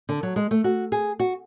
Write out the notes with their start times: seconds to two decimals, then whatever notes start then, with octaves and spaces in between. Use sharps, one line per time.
0.09 D3
0.23 F#3
0.36 G#3
0.51 A3
0.64 F#4
0.92 G#4
1.20 F#4